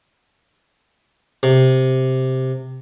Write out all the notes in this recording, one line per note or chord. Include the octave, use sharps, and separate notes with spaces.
C3